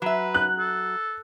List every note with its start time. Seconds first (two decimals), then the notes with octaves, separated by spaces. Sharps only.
0.02 F#3 B4 E5
0.34 F#6
0.59 A4